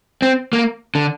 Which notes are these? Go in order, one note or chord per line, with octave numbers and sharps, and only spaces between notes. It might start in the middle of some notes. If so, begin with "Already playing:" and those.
C4
A#3
D3